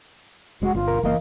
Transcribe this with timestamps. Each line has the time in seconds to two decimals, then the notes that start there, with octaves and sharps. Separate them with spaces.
0.62 F1 G#3 F#4
0.75 G1 F4
0.88 C2 B2 A#4
1.03 F#1 E3 A#3 A#4 D#5 F5